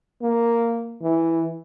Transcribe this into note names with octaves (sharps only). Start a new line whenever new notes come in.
A#3
E3